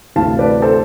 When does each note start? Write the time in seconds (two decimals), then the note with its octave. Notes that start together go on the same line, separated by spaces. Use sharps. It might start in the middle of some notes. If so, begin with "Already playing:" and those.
0.16 D2 C3 E3 F5 A5
0.39 B4 D5
0.62 A4 C5